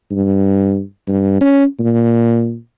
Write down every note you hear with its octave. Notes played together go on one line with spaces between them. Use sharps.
G2
G2
C#4
A#2